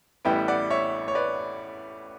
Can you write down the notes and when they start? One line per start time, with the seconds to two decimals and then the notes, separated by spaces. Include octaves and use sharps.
0.25 A1 A2 E3 G3 B3 E5 G5
0.48 D5 F#5
0.70 C#5 E5
1.08 C#5
1.15 B4 D5